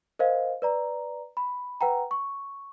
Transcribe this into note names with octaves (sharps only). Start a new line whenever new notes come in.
A#4 C5 D#5 F5
B4 D5 A#5
B5
B4 F#5 G5 A#5
C#6